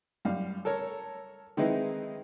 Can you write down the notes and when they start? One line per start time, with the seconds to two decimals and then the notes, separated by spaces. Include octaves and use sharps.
0.25 F#2 G3 F5
0.65 A4 A#4 C#5
1.57 D#3 G#3 C4 D#4 E4 B4